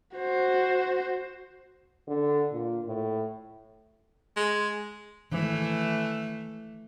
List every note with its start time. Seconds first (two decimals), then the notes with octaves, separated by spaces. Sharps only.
0.17 F#4 C5
2.08 D3
2.52 A#2
2.85 A2
4.36 G#3
5.32 D#3 E3 G#3 A3